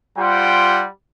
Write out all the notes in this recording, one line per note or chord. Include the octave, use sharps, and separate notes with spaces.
G3 F4 G4 C5 F#5 G5